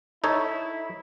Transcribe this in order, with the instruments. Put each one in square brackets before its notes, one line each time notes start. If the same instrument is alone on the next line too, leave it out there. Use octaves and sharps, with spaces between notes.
[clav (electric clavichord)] D#4 A4 C#5 [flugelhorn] E4